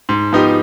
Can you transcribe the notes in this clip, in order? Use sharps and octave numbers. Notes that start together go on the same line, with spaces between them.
G#2
F3 B3 D#4 G4